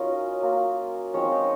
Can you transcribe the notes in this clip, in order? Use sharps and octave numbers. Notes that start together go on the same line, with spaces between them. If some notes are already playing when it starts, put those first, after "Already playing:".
Already playing: F#3 C#4 D#4 F4 G#4 A#4 C#5 D#5
F#3 A#3 F4
F3 G#3 C4 C#4 D#4 C#5
D#4 D#5